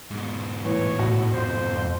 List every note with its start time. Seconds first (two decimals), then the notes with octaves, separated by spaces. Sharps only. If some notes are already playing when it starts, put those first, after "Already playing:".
0.11 G#2 B2
0.65 A2 E3 C#5
0.99 A2 F#4
1.32 F2 C5